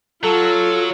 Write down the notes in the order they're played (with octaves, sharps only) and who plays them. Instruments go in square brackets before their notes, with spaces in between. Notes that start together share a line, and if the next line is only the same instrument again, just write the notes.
[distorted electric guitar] F#3 [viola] F4 [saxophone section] A4